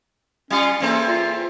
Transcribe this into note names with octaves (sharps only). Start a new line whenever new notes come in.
G3 C#4 F4
E2 A#3 C4 A4
F4